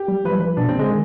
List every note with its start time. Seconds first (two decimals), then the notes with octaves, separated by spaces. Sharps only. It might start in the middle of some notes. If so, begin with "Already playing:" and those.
Already playing: G4
0.08 G3
0.25 F3 B4
0.32 G3
0.40 F3 B4
0.57 B2 D4
0.69 C3 C4
0.78 D3 G#3
0.90 D#3